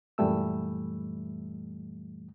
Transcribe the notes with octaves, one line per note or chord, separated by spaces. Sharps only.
F#2 A#2 E3 G3 A3 E6